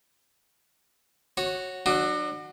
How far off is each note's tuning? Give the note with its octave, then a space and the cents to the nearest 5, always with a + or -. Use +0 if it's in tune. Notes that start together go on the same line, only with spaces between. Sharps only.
F#4 +0 C#5 -15
F#3 +0 D4 +35 F#4 +0